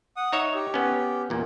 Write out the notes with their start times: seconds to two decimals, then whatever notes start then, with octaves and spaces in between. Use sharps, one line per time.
0.17 F#5 D#6
0.32 D#4 C#5 E5
0.55 G4
0.74 B3 C#4
1.30 E2 A#2